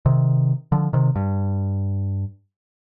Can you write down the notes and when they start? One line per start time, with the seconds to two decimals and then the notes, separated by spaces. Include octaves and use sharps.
0.06 C3 D#3
0.72 D3 F3
0.93 C3 D#3
1.16 G2